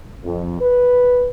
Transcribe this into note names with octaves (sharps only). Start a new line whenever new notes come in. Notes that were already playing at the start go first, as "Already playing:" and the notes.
F2
B4